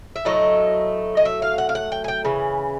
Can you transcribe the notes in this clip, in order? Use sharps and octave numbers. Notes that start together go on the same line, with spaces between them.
E5
A2 F#3 A3 D#5
D#5
E5
F5
F#5
F5
F#5
G5
G#5
G5
C#3 E3